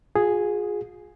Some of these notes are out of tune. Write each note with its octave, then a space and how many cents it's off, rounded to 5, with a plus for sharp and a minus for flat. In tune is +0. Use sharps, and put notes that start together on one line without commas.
F4 +40 G#4 +0